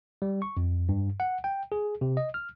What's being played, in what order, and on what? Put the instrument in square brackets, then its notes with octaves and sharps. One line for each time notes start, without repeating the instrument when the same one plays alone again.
[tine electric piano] G3
C#6
F2
G2
F#5
G5
G#4
C3
D#5
F6